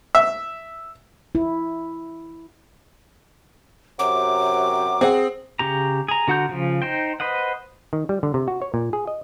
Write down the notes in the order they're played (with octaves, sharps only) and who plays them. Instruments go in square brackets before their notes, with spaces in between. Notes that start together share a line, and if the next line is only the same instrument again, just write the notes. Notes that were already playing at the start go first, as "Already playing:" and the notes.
[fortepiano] E5
[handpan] E4
[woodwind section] F#2 C3 F#3 [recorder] D6
[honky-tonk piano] C4 [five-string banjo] G#4 F#5
[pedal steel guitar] C#3 G4 A#5
G#4 A#5
D3 F#4 F#5 A#5 G6
C#3 F3
D#4 C5 G5
B4 C5 D#5 F#5
[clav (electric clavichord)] D#3
G3
D3
C3
F#4
C#5
A#2
G#4
D#5